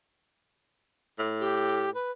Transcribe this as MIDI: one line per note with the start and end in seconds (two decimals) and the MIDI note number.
1.19 1.92 45
1.40 1.92 67
1.94 2.11 71